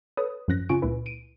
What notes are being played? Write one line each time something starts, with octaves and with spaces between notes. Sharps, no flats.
A4 B4 C#5 D#6
F#2 F3 F#6 A#6
C#3 F4 G#5 C#6 D7
C#2 A#2 E4 B4
D7 D#7